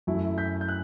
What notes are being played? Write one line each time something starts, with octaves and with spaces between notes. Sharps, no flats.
F#2 F#3 A3 E4
G6 B6
G6
F#6